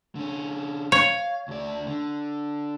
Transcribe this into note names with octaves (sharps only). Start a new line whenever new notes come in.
D3 C#4
C#5 F5
D2 D5
D3